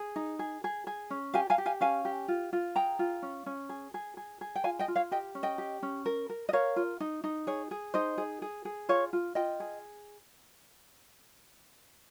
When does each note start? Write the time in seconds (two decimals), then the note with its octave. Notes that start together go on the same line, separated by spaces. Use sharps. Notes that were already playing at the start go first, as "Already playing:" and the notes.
Already playing: G#4
0.16 D#4
0.39 G#4
0.64 G#4
0.87 G#4
1.10 C#4
1.34 G4 F5 G#5
1.50 F5 G#5
1.58 G4
1.66 F5 G#5
1.81 C#4 F5 G#5
2.05 G4
2.28 F4
2.53 F4
2.76 G#4 G5 A#5
2.99 F4
3.22 C#4
3.46 C#4
3.69 G#4
3.94 G#4
4.17 G#4
4.41 G#4
4.55 G5
4.64 F4 F5 G#5
4.79 D#5 G5
4.88 F4
4.96 C#5 F5
5.11 G4 D#5 G5
5.35 C#4
5.43 D#5 G5
5.58 G4
5.83 C#4
6.06 A#4
6.29 A#4
6.49 D#5
6.53 A#4 C#5 F5
6.76 F4
7.00 D#4
7.24 D#4
7.47 G#4 C#5
7.71 G#4
7.94 D#4 C5 D#5
8.18 G#4
8.42 G#4
8.65 G#4
8.89 F4 C#5 F5
9.13 F4
9.35 F4 D#5 G5
9.60 G#4